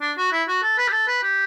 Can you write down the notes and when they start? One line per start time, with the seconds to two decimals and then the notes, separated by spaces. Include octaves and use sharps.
0.01 D4
0.18 F#4
0.32 E4
0.48 F#4
0.63 A4
0.78 B4
0.88 G4
0.92 A4
1.07 B4
1.23 G4